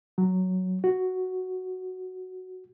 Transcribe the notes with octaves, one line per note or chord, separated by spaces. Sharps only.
F#3
F#4